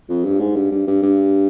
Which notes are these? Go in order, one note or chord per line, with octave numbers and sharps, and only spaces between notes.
F2
G2
G#2
G2
G2
G2
G2